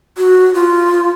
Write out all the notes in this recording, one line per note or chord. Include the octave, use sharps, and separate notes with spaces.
F#4
F4